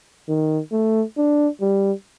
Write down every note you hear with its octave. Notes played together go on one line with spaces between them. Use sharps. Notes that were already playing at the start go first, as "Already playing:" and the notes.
D#3
A3
D4
G3